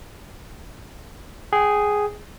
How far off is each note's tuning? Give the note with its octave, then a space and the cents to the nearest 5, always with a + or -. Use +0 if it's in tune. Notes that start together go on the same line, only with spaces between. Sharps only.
G#4 +0 G5 -25